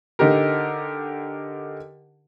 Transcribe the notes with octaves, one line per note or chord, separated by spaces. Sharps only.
D3 D#4 G4 A#4